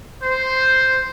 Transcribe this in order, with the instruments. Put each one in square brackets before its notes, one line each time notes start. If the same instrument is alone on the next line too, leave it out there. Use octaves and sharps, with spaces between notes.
[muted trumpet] C5